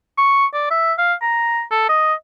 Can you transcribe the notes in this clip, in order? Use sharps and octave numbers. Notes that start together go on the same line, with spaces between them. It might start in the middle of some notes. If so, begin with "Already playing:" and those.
C#6
D5
E5
F5
A#5
A4
D#5